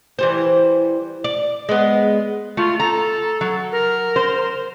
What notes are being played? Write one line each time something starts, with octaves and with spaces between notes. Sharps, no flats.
E3 G3 C5
D5
G#3 B3
A3 F4
A4 A#5
F#3
A#4
C5